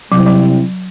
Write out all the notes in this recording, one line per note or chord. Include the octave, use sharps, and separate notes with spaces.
C3 F#3 G3 C4 E4
F#3